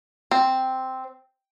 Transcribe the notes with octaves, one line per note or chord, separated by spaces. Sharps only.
C4